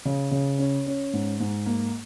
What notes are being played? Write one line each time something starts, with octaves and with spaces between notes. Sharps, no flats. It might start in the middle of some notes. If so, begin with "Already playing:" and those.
C#3
C#3
C#4
C#4
G#2
G#2
A#3